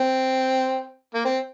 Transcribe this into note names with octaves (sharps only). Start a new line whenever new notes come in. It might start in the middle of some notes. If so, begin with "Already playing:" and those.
Already playing: C4
A#3
C4